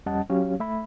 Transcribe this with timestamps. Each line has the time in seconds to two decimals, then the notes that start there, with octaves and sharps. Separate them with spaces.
0.06 F2 G3 C#4 D#5 F#5 A5
0.30 F#3 C#4 G4 C#5 F5
0.60 A3 E5 B5